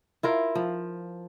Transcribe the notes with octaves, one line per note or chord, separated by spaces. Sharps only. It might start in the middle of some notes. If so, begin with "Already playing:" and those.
E4 F4 A#4
F3